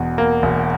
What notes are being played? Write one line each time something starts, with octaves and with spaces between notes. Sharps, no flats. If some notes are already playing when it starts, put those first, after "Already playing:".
Already playing: E1 E2 B2
A#3
E1